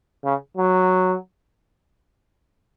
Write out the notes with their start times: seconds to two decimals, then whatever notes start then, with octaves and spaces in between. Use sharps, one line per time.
0.25 C#3
0.57 F#3